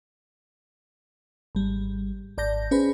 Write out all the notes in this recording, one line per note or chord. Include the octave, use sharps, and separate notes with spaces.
G#1 G3
G#1 D5 A5 G6 A#6
C#4 G#4 B4 C5 B5